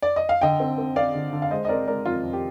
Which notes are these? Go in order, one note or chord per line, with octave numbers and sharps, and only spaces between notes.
D5
D#5
F5
D3 D#5 G5
C4
C4
C4 D5 F5
D3
D3
F5
G#3 C5 D#5
D#5
C4 A#4 D5
G#3 A#4 D5
F2 F4
F2
G4